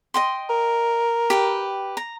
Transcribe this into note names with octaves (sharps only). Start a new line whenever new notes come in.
D#5 G5 C6
A#4
G4 B4 G5
A#5